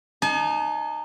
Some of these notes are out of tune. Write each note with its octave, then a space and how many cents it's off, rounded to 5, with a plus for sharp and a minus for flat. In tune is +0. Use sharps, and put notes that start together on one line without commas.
D#4 -25 G#5 +45